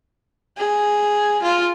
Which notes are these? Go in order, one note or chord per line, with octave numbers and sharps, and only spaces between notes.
G#4
F4